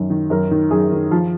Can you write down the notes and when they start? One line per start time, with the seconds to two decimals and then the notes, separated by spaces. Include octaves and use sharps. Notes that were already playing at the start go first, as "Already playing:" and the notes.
Already playing: F#2 D#3
0.10 D#3
0.30 F#2 A#4
0.51 D#3
0.71 F#2 G#4
0.92 D#3
1.11 F3 F4